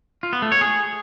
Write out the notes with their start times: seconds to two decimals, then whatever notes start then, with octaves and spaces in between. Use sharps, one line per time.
0.23 F4
0.33 B3
0.42 A3
0.52 C#5
0.61 G#4